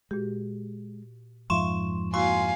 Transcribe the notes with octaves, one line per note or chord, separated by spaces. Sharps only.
A#2 G#3 F#4 G4
F2 G#2 F3 E5 F5 C6 C#6 E7
A#3 E4 F#4 F5 G#5 C6 C#6